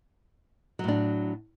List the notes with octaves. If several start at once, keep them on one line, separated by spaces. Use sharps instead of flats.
A2 F#3 D4